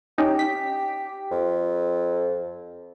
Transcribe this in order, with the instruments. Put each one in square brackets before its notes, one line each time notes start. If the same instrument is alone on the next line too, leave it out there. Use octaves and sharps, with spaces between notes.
[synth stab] C#4 D#4 [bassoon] G4
[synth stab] B6
[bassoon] F2